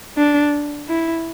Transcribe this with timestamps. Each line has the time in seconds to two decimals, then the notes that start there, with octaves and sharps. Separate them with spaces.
0.17 D4
0.89 E4